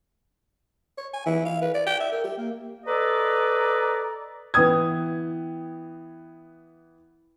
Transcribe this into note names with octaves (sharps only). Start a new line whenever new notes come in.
C#5
G#5
E3
F5
B4
D5
G5
E5
A#4
G4
A#3
A4 B4 D5 D#5 A#5
E3 B3 G5 D#6 G#6